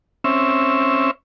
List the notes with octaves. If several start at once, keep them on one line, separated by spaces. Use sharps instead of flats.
C4 C#4 E5